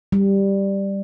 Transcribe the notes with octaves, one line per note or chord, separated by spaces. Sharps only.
G3